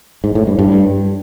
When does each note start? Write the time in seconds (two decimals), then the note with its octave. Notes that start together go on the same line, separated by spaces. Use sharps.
0.24 G#2
0.35 A2
0.47 G2
0.59 G2